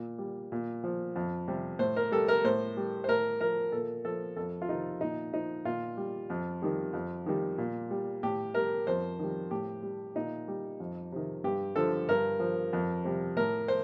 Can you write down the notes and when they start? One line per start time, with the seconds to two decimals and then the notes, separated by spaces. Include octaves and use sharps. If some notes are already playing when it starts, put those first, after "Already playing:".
Already playing: A#2
0.19 G3
0.52 A#2
0.84 F3
1.16 F2
1.48 C3 G3
1.79 A2 C5
1.96 A#4
2.12 G3 A4
2.28 A#4
2.44 A2 C5
2.77 G3
3.04 C5
3.08 A2 A#4
3.40 F3 A#4
3.72 A#2 A4
4.05 F3 A4
4.36 F2 A4
4.62 F4
4.69 C3 D#3 D#4
5.01 A#2 D#4
5.33 F3 D#4
5.65 A#2 F4
5.97 G3
6.30 F2
6.62 D#3 G3
6.93 F2
7.26 D#3 G3
7.58 A#2
7.91 G3
8.23 A2 G4
8.54 G3 A#4
8.87 F2 C5
9.19 D#3 G3
9.51 A2 G4
9.83 G3
10.15 A#2 D#4
10.48 G3
10.80 F2
11.12 C3 D#3
11.44 G2 G4
11.76 D3 F3 A4
12.08 G2 A#4
12.40 F3
12.73 F2
13.04 C3 G3
13.37 A2 A#4
13.68 C5